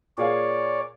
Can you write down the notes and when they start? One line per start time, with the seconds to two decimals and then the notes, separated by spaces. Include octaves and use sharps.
0.18 A#2 G#4 C#5 D5 F5